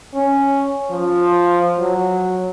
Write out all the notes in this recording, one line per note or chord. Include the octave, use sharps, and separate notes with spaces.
C#4
F3
F#3